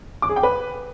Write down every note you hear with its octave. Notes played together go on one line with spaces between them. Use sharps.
D6
G#4
G5
B4